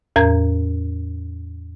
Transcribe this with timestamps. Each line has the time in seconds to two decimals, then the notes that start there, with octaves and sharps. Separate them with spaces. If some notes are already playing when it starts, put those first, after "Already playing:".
0.16 E2 A2 A#4 A#5 G#6